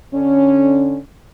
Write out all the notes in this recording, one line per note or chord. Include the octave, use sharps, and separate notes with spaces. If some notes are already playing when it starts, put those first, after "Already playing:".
D3 C#4